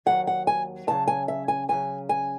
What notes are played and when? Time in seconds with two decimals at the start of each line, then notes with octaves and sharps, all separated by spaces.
0.06 D#2 C#3 F#3 F#5
0.27 F#5
0.47 G#5
0.87 D#2 C#3 F#3 A5
1.07 G#5
1.28 E5
1.48 G#5
1.69 D#2 C#3 F#3 G#5
2.09 G#5